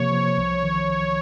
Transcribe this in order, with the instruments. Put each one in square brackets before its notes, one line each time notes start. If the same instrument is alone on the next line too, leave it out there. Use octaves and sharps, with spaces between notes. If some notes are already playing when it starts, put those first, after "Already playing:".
Already playing: [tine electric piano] C3 F3 A#3 [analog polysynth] C#5
[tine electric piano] F3
C2
D#3